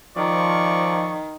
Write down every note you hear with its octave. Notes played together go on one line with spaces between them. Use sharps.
D#3 F3 D5 C#6